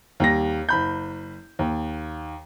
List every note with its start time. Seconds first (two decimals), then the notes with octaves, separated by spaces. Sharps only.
0.20 D#2 G3 A#6
0.69 F#1 B5 G6
1.59 D#2